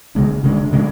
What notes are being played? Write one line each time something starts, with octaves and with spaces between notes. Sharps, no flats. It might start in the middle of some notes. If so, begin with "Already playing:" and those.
C#3 G#3 D4
C#3 G#3 D4
C#3 G#3 D4